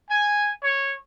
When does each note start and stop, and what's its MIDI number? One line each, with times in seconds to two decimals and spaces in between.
0.10 0.51 80
0.64 0.96 73